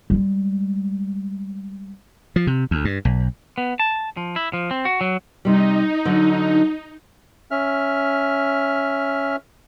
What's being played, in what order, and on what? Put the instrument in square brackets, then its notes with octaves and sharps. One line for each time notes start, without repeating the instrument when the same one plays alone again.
[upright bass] G3 G#3
[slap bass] F3
C3
D2
G2
B1
[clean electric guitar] B3
A5
F3
E4
F3
C4
F#4
F#3
[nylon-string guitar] C3 G3 [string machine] D#4
[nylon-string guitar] D3 F#3
[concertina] C#4 E5 F6